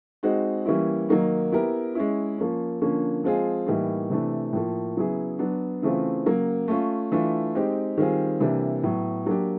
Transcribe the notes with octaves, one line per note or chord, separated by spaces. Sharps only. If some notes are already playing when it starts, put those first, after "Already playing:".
G#3 C4 D#4 F#4
E3 G3 A#3 C#4 E4
D#3 F#3 A#3 D#4
B3 E4 G4 A#4
G#3 C#4 E4
F3 A#3 C#4
D3 F3 A#3 C#4
F3 G#3 C4 F4 G#4
A2 E3 G3 A#3 D#4
C3 E3 A3 D4
A2 F3 A#3
C#3 F#3 B3 E4 G#4
F#3 B3 D4
C#3 E3 A3 C4 F4
C#3 F#3 A#3
A3 C#4 F4
E3 A3 D4 F4
G#3 C4 D#4 G4
D#3 G3 C4 F4 G#4
C3 E3 G3 A#3 D4
A2 F#3 B3
F#3 A#3 D4 G4